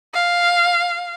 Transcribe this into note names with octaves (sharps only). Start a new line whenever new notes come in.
F5